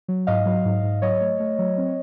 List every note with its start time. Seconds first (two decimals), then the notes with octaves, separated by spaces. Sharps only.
0.08 F#3
0.27 G#2 D#5 F5
0.46 F#3
0.65 G#2
0.83 G#2
1.02 F#3 C#5 D#5
1.21 A3
1.40 A3
1.59 F#3
1.78 C4